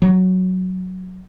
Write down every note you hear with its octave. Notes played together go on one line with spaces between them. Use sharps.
F#3